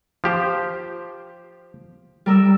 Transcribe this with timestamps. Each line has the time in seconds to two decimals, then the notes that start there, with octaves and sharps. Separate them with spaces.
0.24 F3 G4 C5
2.26 G3 A#4 E6